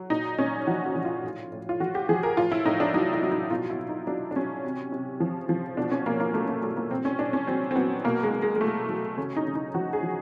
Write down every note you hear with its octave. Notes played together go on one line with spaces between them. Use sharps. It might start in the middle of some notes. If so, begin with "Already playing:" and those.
Already playing: F#3
A#2 D#4
A#2 C#4
F3 F#4
F#4
F3
F4
A2
A2
F4
F3 F#4
G4
F3 G#4
A#4
A2 F4
E4
A2 D#4
D4
F#3 D#4
E4
F#3
D#4
B2 F4
E4
B2
D#4
F#3 D4
D4
F#3 C#4
C3
C3
F3
F3
B2 D4
C#4
B2 A#3
A#3
F#3 A3
A#3
F#3 A3
A#3
A#2 C4
C#4
A#2 D4
C#4
F#3 C4
C4
F#3 B3
B2 A#3
G#3
B2
G#3
G#3
F#3 A3
F#3
C#3 C#4
D#4
C#3
D#4
F3 F#4
G#4
F3